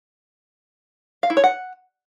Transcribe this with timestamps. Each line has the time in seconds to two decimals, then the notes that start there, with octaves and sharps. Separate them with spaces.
1.23 F5
1.30 E4
1.37 C#5
1.44 F#5